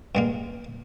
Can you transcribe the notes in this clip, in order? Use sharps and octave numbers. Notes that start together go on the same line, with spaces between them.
G2 G#3 A#3